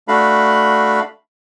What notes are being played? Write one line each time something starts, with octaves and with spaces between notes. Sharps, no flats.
A3 D4 F#4 F5 B5